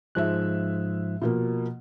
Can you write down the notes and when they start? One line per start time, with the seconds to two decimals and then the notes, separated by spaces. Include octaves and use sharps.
0.15 G#2 F3 G#3 E5 F#6
1.22 B2 F3 A#3